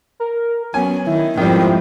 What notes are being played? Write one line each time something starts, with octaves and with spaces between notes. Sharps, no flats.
A#4
F#3 B3 C#4 G#5
D#3 E4
F2 G#2 D#3 F3 G3